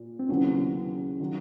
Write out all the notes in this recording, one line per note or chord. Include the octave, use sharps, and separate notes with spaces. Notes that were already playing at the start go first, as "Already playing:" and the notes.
Already playing: A#2
C4
D#2 C#3 F#3 B3 C#4 E4
D#3 F#3